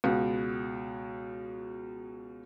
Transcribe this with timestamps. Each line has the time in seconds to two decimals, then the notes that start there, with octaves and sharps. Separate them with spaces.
0.04 C#2 B2